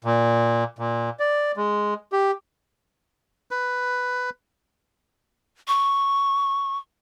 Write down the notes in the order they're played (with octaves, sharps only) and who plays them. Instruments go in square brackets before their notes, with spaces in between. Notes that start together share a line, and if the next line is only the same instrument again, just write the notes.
[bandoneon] A#2
A#2
D5
G#3
G4
[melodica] B4
[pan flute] C#6